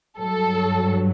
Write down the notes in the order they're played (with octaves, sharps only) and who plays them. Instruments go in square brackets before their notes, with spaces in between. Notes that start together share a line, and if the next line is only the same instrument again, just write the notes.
[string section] G2 F#3 A4